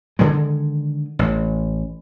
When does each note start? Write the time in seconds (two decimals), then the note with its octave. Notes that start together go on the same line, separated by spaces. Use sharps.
0.19 D3 D#3 G#3
1.19 A1